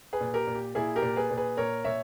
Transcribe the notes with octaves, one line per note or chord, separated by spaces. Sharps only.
G#4 B4
A#2
G4 A#4
A#2
G4
A#2 E4 G#4
G4 A#4
A#2
G#4 B4
A#2
G#4 B4
A#2 A#4 C#5
A#2 C#5 E5